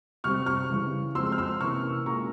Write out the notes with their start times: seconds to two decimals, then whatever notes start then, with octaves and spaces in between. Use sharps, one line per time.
0.24 C3 G3 C4 C#6 F6
0.46 C#6 F6
0.70 C#3 E3 G3
1.15 F3 G#3 C4 C6 E6
1.32 F6
1.38 C6 E6
1.61 C3 E3 A#3 C#4 C#6 F6
2.06 A#2 G#3 C#4 A#5 C#6